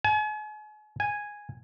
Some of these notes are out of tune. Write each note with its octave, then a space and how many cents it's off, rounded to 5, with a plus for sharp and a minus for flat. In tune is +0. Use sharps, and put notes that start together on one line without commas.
G#5 +40
G#5 -5